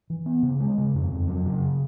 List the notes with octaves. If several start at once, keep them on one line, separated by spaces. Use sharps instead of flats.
E3
B3
C#3
G#3
C#3
F2
F2
F#3
C#3